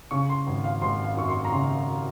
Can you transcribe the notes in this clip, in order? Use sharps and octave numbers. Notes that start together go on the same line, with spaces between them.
C#3 C#6
C6
G#1
F5
G#1 C6
F5
F#2 C#6
C6
A#5
C#3 C6